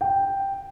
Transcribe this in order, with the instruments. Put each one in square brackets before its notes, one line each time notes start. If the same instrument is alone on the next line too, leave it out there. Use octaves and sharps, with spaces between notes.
[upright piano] G5